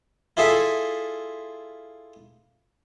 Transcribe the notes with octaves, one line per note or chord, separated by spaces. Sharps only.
E4 F4 G#4 A4 E5